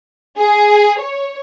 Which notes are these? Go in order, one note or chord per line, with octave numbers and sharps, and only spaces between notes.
G#4
C#5